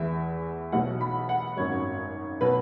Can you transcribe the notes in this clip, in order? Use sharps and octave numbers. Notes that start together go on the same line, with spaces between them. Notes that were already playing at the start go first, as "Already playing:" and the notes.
Already playing: E2 E3 E5
B1 B2 F#3 F#5
B5
F#5
G#1 F#2 F#3 C#5
B2 F#3 B4